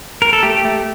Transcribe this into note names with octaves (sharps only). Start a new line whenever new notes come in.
A#4
A4
A3 G4
A3